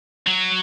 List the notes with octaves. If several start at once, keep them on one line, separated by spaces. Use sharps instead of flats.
F#3